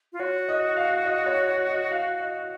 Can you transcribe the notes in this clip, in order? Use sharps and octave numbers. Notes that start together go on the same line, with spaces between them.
F4
F#4 C#5
D#5
F5
D#5
C#5
C#5
D#5
F5
D#5